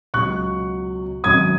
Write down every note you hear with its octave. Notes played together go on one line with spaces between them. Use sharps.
C#2 B2 F#3 C#6 F#6
G#1 F#2 F#3 D#6 G#6